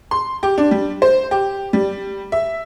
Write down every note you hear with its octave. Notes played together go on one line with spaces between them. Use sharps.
C6
G4
D4
G3
C5
G4
G3
E5